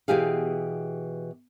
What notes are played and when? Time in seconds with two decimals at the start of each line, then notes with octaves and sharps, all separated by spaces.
0.08 B2 E3 G4 G#4 F5